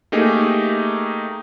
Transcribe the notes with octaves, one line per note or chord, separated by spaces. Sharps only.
A3 A#3 D#4 G4 G#4